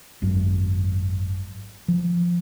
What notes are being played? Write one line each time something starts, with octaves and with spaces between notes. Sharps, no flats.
G#1 F#2
F3